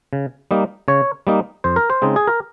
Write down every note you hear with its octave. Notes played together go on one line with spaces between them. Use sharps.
C#3
G3 A#3 D#4
C#3 C#5
G3 A#3 D#4
F2 C5
A#4
C5
C#3 G#3 C4 D#4
G#4
A#4